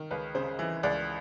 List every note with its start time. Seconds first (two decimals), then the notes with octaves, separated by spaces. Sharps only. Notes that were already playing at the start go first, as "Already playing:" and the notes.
Already playing: D#3
0.11 C#2 B4
0.35 C#3 C5
0.59 E3
0.83 C#2 D5